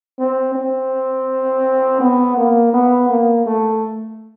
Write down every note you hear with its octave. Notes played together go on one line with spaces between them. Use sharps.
C4
C4
B3
A#3
B3
A#3
A3